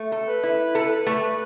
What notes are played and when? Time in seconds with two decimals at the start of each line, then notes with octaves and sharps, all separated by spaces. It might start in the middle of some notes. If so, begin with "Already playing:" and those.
Already playing: A3
0.12 A4
0.28 B4
0.43 E4
0.75 A4
1.06 A3